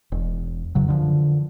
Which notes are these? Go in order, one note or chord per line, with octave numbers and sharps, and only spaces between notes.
E1
F#2 C#3 F#3
D3 D#3 F3